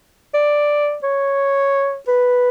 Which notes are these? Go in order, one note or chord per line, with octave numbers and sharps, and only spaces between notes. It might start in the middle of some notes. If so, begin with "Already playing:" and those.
D5
C#5
B4